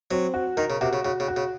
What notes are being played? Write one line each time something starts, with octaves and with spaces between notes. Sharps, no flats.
F#3 C4
F#4
D#3 A#4
C#3
C3 F#4
C#3
C#3 F#4
C#3
F#4
C#3